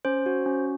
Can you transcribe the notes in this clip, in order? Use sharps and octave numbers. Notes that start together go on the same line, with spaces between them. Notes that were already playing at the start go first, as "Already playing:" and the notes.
C#4 C5
F#4
C#4